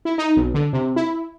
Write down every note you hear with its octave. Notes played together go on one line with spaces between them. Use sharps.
E4
D#4
B1
D3
C3
E4